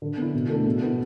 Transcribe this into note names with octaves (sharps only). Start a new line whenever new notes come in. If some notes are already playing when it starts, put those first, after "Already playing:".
D3
B3 E4
B2
A3 D4
B2
B3 E4